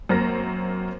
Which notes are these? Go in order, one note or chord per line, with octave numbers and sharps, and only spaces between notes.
F#2 A#3 C4 A#5 F6 A#6